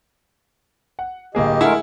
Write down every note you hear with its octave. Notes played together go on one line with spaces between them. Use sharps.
F#5
D1 A#3 G4 G#4 D#5
G#3 A3 E4 G#4 A#4 F#5